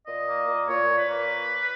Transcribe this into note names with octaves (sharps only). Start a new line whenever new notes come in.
A#2 D#5
A#3
A#2
A#2 C#5
A#2
B4
A#3